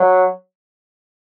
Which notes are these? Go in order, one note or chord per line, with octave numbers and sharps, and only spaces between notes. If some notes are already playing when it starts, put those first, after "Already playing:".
Already playing: F#3